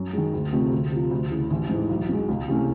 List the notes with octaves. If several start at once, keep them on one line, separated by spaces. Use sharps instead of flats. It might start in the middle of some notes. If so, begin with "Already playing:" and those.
Already playing: F#2
D#3 G#3
D2
C3 F3 A3 C4
D2
C3 F3
D2
C#3 E3
A1
G#2 E3
B1
B2 G#3
C#2
C3 E3 A3 C#4